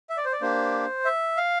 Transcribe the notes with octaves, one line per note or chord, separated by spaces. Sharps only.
E5
D5
C5
D5
A#3 D4 G4 C5
E5
F5